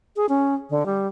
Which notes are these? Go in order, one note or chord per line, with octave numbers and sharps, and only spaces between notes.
G#4
C#4
D3
G3